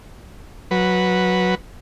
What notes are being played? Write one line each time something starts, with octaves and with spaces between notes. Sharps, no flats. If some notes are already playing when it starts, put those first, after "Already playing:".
F#3 B4